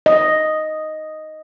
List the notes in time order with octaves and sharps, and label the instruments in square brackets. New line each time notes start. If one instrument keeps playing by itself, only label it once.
[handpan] D#5